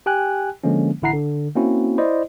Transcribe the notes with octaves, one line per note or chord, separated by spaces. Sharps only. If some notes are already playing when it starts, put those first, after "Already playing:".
G4 G5 G#5 F#6
D3 F3 G#3 A#3 C#4
A1 D3 E4 F#5 A#5 C7
D3
A#3 C4 C#4 E4 F#4
E4 C5 D5 D#5